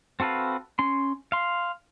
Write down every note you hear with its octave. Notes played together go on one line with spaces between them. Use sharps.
C4 F#4 A4 B4 F5
C#4 C6
F5 C6